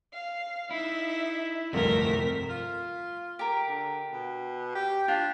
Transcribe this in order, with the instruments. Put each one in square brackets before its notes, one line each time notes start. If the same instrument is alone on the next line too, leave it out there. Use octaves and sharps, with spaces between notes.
[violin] F5
[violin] D#4 E5 [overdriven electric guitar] E4
[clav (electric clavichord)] G1 C2 F2 [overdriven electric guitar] C3 [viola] A3 A#4 [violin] B6
[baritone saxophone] F4
[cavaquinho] G4 A#4
[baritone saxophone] D3
B2
G4
[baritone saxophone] D4 [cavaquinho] F4